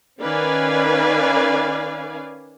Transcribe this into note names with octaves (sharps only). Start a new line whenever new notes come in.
D#3 C#4 B4 D5 F5 G#5